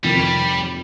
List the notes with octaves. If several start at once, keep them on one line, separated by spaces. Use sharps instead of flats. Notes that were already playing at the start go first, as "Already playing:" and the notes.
F2 C3 D#3 G3